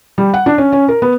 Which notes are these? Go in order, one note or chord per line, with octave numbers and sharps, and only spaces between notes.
G3
F#5
D4
C#4
C#4
A#4
B3